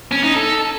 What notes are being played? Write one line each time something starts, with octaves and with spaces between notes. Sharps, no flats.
C#4
D#4
A4